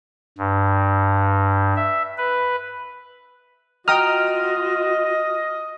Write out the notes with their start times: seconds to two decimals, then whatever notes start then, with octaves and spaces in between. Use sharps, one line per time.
0.38 G2
1.76 E5
2.17 B4
3.88 F4 F#4 D#5 G5 A#5 D#6 F6